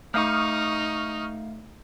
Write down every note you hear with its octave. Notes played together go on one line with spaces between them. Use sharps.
A3 D#4 F5 C#6 D#6 F6